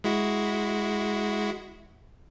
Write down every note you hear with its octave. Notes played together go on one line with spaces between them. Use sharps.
G#3 E4 F#4